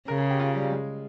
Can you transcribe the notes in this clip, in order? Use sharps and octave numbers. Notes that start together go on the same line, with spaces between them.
C#3 A#4
G#4
G4
F4
G3
G#3